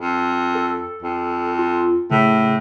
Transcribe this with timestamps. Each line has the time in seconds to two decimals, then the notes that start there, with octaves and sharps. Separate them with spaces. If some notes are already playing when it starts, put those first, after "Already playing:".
0.01 F2
0.55 A4
1.02 F2
1.59 F4
2.11 A2 C#3